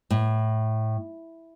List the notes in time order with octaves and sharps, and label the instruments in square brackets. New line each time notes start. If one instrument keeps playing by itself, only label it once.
[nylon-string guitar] A2